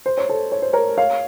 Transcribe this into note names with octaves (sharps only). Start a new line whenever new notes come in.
C5
C#5
A4 C5
C#5
C5
A#4 C#5
C#5 F5